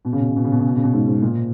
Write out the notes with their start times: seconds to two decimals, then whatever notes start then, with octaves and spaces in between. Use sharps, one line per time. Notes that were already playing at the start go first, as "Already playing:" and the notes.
0.05 B2
0.13 C#3
0.20 B2
0.28 C#3
0.36 B2
0.44 C#3
0.52 B2
0.59 C#3
0.67 B2
0.76 C#3
0.84 B2
0.93 G#2
1.08 G#2
1.22 A#2